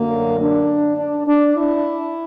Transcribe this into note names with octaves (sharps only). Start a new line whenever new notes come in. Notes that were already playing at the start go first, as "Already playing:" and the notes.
Already playing: F#2 D3 A#3
D4
D4
D4
E4